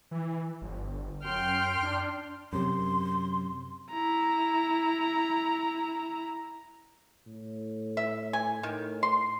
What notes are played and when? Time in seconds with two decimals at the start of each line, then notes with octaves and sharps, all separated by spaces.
0.11 E3
0.62 G1
1.24 F#2 G5 C6 F6
1.83 D4
2.53 F#2 C3 C6
3.91 E4 A#5
7.27 A2
7.97 E5
8.33 G#5
8.63 A2 D#3
9.03 C6